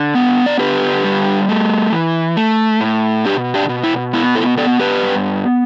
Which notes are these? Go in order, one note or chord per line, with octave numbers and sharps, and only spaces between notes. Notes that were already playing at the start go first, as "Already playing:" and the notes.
Already playing: D3
B3
D5
D3 G4 B4
G3
A3
E3
A3
A2
B2 D4 G4
D4 G4
B2
E4
B3 E4
E4 A4
B3 A4 D5
G4 B4
G2